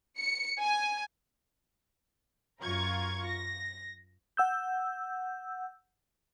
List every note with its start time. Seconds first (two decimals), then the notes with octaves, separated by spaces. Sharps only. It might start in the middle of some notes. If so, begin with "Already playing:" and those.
0.18 C#7
0.61 G#5
2.62 F#2 F4 A#5 C#6 G#6
3.26 A#6
4.37 F#5 E6 G6